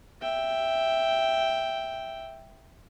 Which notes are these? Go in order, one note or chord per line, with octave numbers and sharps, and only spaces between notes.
E5 G5